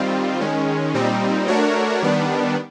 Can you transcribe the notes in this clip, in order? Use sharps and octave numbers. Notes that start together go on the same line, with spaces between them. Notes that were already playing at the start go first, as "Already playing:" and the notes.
Already playing: D#3 G3 C4 F4
D#3 G#3 C#4
A#2 G3 C4 D#4
A3 D4 F#4 A#4 C#5
D#3 G3 B3 D4